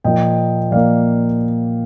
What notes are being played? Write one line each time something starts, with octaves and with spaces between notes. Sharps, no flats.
A#2 F3 A#3 D#5 G5
A#2 F3 A#3 D5 F5